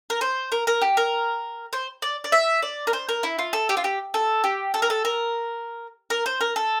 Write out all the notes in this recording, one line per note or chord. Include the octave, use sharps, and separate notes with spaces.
A#4
C5
A#4
A#4
G4
A#4
C5
D5
D5
E5
D5
A#4
C5
A#4
E4
F4
A4
G4
F4
G4
A4
G4
A4
A#4
A4
A#4
A#4
C5
A#4
A4